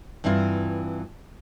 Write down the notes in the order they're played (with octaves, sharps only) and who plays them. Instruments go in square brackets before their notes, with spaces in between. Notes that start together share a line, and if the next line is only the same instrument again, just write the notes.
[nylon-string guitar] G2 E3 C4 E4 F4